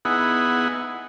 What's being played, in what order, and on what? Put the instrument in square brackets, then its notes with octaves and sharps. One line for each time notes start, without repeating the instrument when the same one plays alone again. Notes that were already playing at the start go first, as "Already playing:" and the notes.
[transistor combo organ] B3 D#4 E4 G#4 F#5